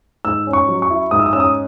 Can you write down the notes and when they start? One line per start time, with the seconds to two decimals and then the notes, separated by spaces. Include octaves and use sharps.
0.25 G#2 E6
0.47 C#4
0.53 C#6
0.68 F#3
0.82 C#6
0.90 E4
1.11 G#2 D#6
1.19 E6
1.26 D#6
1.33 C#4 E6
1.40 D#6